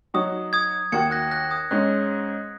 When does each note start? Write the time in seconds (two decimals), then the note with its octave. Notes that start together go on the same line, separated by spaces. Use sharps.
0.14 F#3 D#4 F#4 C#5 D#6
0.53 D#6 G#6
0.92 D#2 D#3 A#3 F#4 G#6 C#7
1.11 F#6 A#6
1.31 F#6 A#6
1.50 D#6 G#6
1.71 G#2 G#3 C#4 F#6